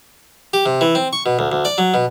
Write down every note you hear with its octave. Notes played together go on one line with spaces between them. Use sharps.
G4
C3
E3
C4
C#6
B2
D2
D2
D5
F#3
B2